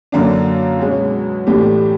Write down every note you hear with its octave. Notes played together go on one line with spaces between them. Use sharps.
F#2 D3 F#3 A#3 D4
B2 G#3 C#4
A2 E3 A3 D4 G4